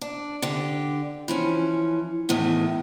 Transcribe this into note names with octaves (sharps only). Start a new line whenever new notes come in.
D4
D3 G4
E3 F3 C#4
E2 A2 D#3 E3